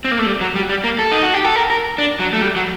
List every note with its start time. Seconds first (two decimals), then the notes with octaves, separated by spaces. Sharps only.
0.05 C4
0.12 A#3
0.19 A3
0.26 G3
0.41 F#3
0.56 G3
0.69 G3
0.84 A#3
0.99 A4
1.12 D#4
1.23 F#4
1.34 G4
1.44 A4
1.56 A#4
1.70 A#4
1.98 D4
2.20 F#3
2.33 A3
2.42 G3
2.56 F#3